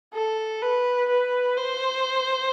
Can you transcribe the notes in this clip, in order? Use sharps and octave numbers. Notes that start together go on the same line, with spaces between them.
A4
B4
B4
C5